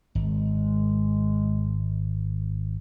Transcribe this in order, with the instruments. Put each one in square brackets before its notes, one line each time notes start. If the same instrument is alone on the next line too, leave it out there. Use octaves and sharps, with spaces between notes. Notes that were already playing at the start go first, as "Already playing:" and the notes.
[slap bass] G#1 [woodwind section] G#3